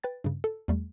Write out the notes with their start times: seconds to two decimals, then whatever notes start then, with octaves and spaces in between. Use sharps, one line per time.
0.04 B4 G5 A6
0.24 G2 C#3
0.44 A4
0.68 E2 G3 A3